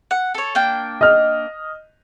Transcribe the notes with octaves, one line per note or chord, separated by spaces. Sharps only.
F#5
A4 C#5
A#3 D4 G5
D#5 F6